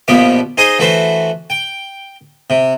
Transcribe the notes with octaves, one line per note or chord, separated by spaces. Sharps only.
A#1 B2 F3 G3 B3 D6
D#4 G#4 C5 D#5 D#6
E3 A3 F#4 B4 C5
G5
C3